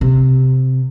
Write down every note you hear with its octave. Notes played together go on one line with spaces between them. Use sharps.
C3